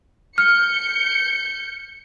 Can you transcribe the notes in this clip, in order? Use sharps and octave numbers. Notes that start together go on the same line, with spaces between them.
F6 G6 C#7